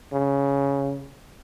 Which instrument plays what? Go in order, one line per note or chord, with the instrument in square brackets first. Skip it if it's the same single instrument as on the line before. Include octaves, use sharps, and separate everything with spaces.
[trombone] C#3